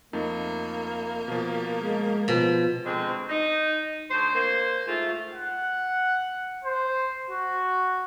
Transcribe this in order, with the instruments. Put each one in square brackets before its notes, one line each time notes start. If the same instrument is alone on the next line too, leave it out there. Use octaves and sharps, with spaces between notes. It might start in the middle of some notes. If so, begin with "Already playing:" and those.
[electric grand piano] F2 A3 D#4 [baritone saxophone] A#3
[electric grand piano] B2 F3
[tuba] G#3
[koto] B2 [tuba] F3
[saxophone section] D2 G#3 C4
D#4
D2 C5
A#3 C5
G#2 A3 F4
[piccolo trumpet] F#5
C5
F#4